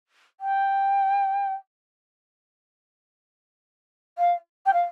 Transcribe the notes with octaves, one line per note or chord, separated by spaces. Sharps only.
G5
F5
G5
F5